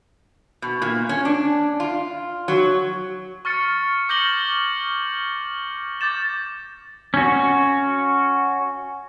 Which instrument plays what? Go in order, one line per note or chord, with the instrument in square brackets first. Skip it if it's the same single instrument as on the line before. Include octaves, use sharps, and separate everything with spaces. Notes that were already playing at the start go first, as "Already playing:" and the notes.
[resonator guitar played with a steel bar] B2
A#2
C#4
D4
F4
F#3
[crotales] C#6 F6 A6 C#7
D6 G6 A#6 C#7 F#7 G7
D6 G6 A6 E7
[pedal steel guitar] C#4 F#4